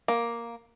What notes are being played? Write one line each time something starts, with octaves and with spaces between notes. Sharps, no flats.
A#3